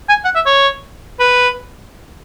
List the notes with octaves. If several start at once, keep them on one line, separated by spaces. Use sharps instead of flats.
G#5
F#5
E5
C#5
B4